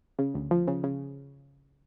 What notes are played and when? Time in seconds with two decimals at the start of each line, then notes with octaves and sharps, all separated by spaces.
0.19 C#3
0.34 D2
0.51 F3
0.67 C#3
0.84 C#3